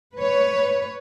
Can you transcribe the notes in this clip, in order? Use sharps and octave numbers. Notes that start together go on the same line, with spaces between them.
B4 C#5